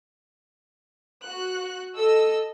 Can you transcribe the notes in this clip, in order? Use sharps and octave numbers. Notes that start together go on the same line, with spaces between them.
F#4 F#6
A4 D#5 E6